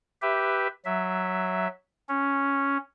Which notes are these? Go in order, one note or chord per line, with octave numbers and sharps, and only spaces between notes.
G4 B4 E5
F#3 E5
C#4